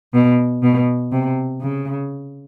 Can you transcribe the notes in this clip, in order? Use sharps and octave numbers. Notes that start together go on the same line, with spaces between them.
B2
B2
C3
C#3